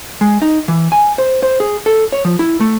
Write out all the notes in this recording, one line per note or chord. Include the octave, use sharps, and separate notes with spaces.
G#3
D#4
E3
G#5
C5
C5
G#4
A4
C#5
F3
E4
A3